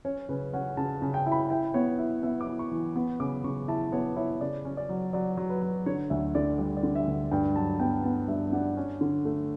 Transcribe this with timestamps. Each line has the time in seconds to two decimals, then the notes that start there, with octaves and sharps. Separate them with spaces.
0.05 C#4 C#5
0.29 C#3 B4
0.53 C#4 F#5
0.77 C#3 A5
1.02 C#3
1.14 G5
1.26 E4
1.32 B5
1.50 E4 G5
1.74 B3 C#5
1.98 E4
2.23 B3 E5
2.41 D6
2.48 E4
2.59 C#6
2.72 E3
2.96 B3
3.20 C#3 D6
3.44 C#3 C#6
3.68 E4 A5
3.92 B3 C#5
4.16 E4 C#5
4.41 C#3 D5
4.65 C#4
4.77 D5
4.89 F#3
5.13 F#3 D5
5.37 F#3
5.50 B4
5.62 F#3
5.86 D3 C#5
6.10 D2 E5
6.35 D3 D5
6.59 G3 D5
6.77 D5
6.83 D3
6.95 E5
7.07 D2
7.31 G2 G5
7.56 F#3 A5
7.79 B3 G5
8.04 B3 A5
8.28 G2 E5
8.52 D4 F#5
8.77 C#4
9.01 D3
9.25 A3